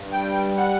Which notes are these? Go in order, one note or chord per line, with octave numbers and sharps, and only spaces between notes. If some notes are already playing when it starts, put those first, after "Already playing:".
Already playing: G2
G3 G5
F#5